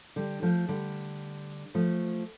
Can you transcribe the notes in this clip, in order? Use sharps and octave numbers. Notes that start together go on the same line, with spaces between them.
D3 G3
F3 A3
D3 G3
F3 A3